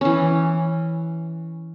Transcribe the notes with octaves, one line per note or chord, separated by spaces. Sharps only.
E3 C#4